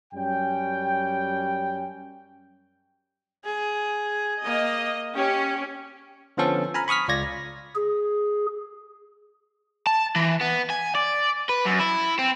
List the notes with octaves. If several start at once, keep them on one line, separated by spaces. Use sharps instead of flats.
F#2 G3 C#4 G5
G#4
A#3 D#5
C#4 G4
D3 F3 B3 C#4 A4 C5
G#5 A#5 B5 F6
B5 C#6 D#6 F6 B6
C#2 F4 D5 G#6 A#6
G#4
A5
E3
B3
G#5
D5
B4
F#2
E4
C4